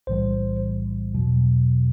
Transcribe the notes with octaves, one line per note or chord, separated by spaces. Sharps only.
B1 A2 E3 G3 C5
E2 B2 F#3